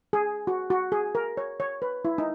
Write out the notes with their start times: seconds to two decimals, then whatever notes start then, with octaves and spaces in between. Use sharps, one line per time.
0.13 G#4
0.47 F#4
0.70 F#4
0.92 G#4
1.15 A#4
1.37 C#5
1.60 C#5
1.82 B4
2.05 E4
2.18 D#4